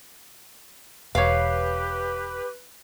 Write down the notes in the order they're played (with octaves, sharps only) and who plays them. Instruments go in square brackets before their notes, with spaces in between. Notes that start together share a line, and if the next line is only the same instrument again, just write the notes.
[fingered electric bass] E1 [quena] G4 [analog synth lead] B4 [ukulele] C#5 F5